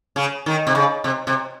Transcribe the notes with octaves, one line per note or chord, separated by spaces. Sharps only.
C#3
D#3
C3
C#3
C3
C3